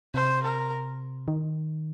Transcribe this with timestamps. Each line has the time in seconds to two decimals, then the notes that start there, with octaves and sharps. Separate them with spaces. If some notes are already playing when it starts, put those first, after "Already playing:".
0.14 C3 C5
0.43 A#4
1.28 D#3